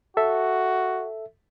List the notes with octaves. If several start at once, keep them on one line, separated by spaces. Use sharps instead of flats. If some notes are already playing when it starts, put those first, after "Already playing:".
F#4 A4 E5